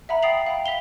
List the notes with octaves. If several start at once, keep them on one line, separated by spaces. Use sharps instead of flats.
E5 F#5 A#5 B5
G5 D#6 A6 C7 F7 F#7
F5 G5 B5
F5 B6 F7 G7